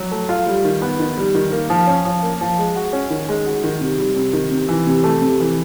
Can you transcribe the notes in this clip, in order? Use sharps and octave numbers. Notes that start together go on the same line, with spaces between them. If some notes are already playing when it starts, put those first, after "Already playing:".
Already playing: F#3
A3
F4
G3
D#3
B3
D#3
G3
D#3
A#3
F3
C#4
F3
A#3
F3
G#3
F#4
C#4
D#3
G#3
F#4
D#3
C3
G3
C3
D#3
C3
E3
C3
A3
C3
E3